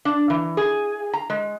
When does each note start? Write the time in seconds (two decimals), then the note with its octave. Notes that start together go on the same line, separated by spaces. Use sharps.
0.05 D4
0.30 E3
0.57 G#4
1.13 A#5
1.30 G#3